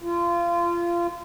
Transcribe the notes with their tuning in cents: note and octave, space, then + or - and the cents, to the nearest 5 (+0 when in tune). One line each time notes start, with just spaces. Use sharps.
F4 -25